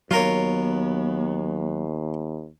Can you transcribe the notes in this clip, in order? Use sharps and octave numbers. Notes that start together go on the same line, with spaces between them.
D#2 F#3 B3 F4 A#4 C#5